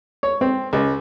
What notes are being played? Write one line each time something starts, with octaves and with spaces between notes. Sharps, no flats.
C#5
C4
C#2